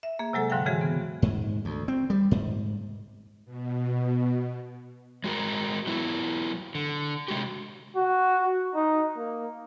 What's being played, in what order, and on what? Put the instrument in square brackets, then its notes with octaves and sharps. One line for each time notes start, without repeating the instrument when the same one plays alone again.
[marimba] E5
A#3 G#4
C3 F#3 G#3 A4
G#2 D3 F#3 F5 G5
C#3 E3 G#3 F#4 G#4
B3
[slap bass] G#2
D2
C4
G3
G#2
[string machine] B2
[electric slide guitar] G#3 F#4 G#4 A#4
F#3 B3 E4
D3
C3 G#3 F#4 G4
[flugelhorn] F#4
D#4
A#3